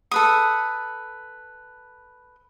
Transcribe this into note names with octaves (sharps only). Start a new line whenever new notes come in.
A4 B4 D#6